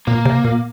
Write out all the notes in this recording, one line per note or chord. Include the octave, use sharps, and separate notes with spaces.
A#2 A#3
C3
A#2